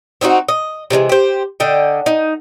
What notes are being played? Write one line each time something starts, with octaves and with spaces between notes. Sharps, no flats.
C4 D#4 E4 F#4
D#5
C3 E3 G3 G#3
G4 C5
D3 D#5 G5
D#4